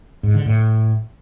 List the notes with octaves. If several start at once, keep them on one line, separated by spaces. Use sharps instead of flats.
G#2
D3
A2